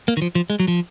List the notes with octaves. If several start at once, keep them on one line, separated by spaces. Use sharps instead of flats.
A#3
D#3
F3
F3
G#3
F#3
F3